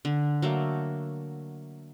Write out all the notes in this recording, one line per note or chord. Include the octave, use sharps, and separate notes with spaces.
D3
F#3 A3 A#3